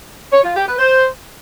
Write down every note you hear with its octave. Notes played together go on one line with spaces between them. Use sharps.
C#5
F4
G4
B4
C5